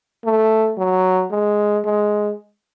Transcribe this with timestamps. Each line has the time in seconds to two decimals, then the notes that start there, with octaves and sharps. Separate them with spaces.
0.25 A3
0.78 F#3
1.31 G#3
1.85 G#3